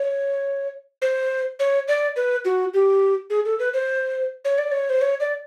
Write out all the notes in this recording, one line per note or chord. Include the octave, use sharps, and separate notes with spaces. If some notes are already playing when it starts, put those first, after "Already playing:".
Already playing: C#5
C5
C#5
D5
B4
F#4
G4
G#4
A4
B4
C5
C#5
D5
C#5
C5
C#5
D5